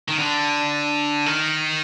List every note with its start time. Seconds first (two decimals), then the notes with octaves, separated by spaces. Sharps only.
0.08 D#3
0.19 D3
1.26 D#3